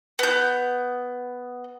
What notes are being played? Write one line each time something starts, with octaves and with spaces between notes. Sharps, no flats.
B3 G6